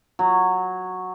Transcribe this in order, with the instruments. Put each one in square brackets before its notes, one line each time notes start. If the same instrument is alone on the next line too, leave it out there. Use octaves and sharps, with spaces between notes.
[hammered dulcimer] F#3